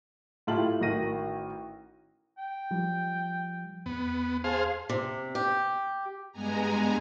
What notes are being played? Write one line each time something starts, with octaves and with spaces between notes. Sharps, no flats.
A2 E4 F4 G4 A5 F#7
A1 D#3 F#4 A#4 A#6 D#7
G5
F3 G3
E2 B3
G#4 C5 F5 A5
C3
G4
G2 G#3 B3 G#5 A#5